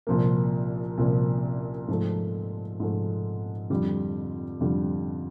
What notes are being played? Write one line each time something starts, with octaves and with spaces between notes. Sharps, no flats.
C2 A#2 F3 A#3
C2 A#2 F3 A#3
G#2 F3 A3
G#2 F3 A3
F2 D3 G3
F2 D3 G3